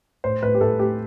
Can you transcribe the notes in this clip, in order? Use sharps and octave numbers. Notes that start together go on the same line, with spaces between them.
A2 C5
A2 B4
G4
A2 A4
A3 G4